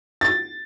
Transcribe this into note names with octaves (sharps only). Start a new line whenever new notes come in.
A6